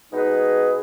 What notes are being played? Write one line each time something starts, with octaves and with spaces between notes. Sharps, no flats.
B2 G#3 D#4 G#4 B4